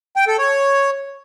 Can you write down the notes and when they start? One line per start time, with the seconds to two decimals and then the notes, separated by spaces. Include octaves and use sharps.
0.16 G5
0.27 A4
0.38 C#5